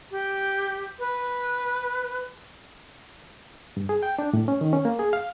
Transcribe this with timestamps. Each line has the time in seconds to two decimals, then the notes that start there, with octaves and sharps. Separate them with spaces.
0.11 G4
0.99 B4
3.77 G2
3.89 G#4
4.03 G5
4.19 D4
4.33 A2
4.48 C#4
4.61 D#3
4.73 C#4
4.85 A#3
4.99 G#4
5.13 F5